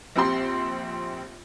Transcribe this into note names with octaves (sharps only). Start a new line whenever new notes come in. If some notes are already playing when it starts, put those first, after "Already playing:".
A#1 C4 G4 C6